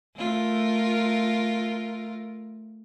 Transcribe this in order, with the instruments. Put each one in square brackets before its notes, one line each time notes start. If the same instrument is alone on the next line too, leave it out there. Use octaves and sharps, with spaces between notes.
[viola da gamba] A3 F4 A#4